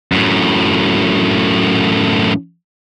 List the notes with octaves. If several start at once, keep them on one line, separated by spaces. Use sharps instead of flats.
F#2 A2